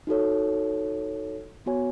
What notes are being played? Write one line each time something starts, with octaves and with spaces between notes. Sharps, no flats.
D#4 F#4 A4 C#5
B3 F#4 C#5 G#5